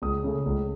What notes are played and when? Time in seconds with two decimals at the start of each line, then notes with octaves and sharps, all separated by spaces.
0.02 C#2 D#6
0.24 C#3 A3
0.46 C#2